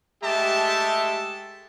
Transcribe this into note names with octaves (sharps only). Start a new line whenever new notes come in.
G#3 A3 G4 E5 A5